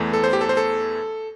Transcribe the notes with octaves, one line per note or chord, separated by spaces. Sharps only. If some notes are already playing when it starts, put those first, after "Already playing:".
Already playing: E2 E3 A3
A4
C5
G4
A4
C5
A4